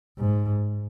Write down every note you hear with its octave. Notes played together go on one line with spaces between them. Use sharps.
G#2